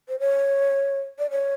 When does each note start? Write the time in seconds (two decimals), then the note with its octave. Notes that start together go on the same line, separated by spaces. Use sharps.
0.09 C5
0.19 C#5
1.19 D5
1.31 C#5